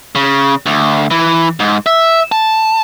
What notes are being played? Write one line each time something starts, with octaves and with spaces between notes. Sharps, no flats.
C#3
D2
E3
G#2
E5
A5